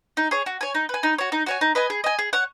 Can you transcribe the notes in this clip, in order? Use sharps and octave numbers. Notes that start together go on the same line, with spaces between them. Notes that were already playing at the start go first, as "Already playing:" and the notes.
D#4
G#4 C#5
F#4
C#5 G#5
D#4
B4 G#5
D#4
F#4 C#5
D#4
F#4 C#5 G#5
D#4
B4 D#5 G#5
G#4
D#5 G#5
G#4
C#5 F#5